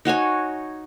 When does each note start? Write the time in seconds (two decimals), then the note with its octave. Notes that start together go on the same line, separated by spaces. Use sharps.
0.05 D#4 F#4 C#5 G#5